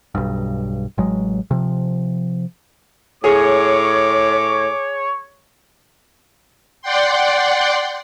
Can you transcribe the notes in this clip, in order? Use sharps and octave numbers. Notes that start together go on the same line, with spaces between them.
B1 G2
A1 F#3 G#3
C3 F3
A2 G#4 C#5 D6
D5 F#5 G5 C6